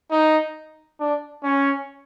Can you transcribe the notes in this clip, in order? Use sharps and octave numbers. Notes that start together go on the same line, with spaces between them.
D#4
D4
C#4